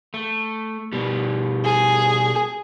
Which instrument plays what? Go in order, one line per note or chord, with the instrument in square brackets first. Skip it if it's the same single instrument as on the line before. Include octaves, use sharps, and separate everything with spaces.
[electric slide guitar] A3
B2 G3
[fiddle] G#4